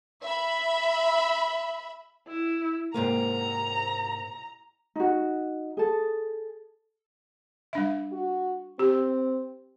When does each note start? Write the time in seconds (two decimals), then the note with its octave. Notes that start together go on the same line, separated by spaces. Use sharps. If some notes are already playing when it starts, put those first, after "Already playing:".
0.22 E5 B5
2.27 E4
2.94 G#2 C3 A#3 A#5
4.96 D#4 F#4
5.77 G#4 A4
7.73 G3 D4 E5
8.12 F#4
8.79 C4 G4